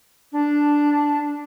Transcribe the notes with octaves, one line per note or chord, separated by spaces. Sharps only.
D4